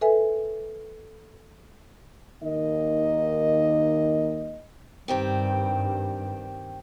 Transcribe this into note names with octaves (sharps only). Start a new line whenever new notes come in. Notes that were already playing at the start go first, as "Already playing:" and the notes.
A4 B4 E5 G#5
D#2 D#3 A#3 D#4 D#5
G2 D#3 C4 G4